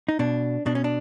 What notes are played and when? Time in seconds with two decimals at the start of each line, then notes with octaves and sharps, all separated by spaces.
0.09 D#4
0.19 B2 D4
0.66 B2 D4
0.75 C#4
0.84 D4